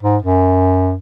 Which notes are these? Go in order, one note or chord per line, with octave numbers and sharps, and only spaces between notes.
G#2
F#2